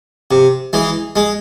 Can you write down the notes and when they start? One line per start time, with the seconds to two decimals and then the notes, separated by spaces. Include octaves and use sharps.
0.31 C3
0.73 E3 G#3
1.16 G#3